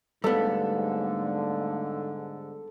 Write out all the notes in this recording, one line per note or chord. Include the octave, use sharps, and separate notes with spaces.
G#2 D3 G3 A3 B3 A4 F5